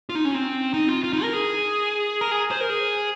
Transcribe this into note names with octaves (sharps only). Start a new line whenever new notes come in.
F4
D#4
C#4
C4
D#4
F4
F4
D#4
A#4
G#4
A#4
G#4
C5
A#4
G#4